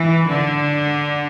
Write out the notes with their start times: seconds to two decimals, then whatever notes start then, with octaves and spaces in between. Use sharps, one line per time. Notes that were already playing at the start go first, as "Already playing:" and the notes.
Already playing: E3
0.28 D3